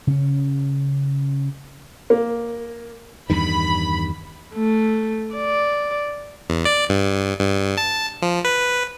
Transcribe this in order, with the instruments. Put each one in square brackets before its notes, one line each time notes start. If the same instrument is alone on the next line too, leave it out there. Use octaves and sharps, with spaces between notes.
[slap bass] C#3 C#4
[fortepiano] A#3
[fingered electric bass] E2 G2 D#3 [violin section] B5
[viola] A3
D5
[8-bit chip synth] E2
D5
G2
G2
A5
F3
B4